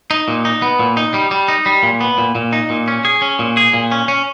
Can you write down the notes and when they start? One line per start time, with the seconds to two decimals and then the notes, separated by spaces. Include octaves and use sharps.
0.11 D#4
0.28 A#2
0.45 D#4
0.62 B3
0.79 A#2
0.97 D#4
1.14 G3
1.31 G3
1.48 D#4
1.66 G3
1.83 A#2
2.01 B3
2.18 A#2
2.35 A#2
2.53 D#4
2.70 A#2
2.88 C#4
3.05 G#4
3.22 C#4
3.39 A#2
3.57 G#4
3.74 A#2
3.92 C#4
4.08 C#4